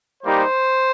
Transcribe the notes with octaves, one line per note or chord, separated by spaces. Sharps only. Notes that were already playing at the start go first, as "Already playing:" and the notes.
G3 A#3 D#4 G4 C5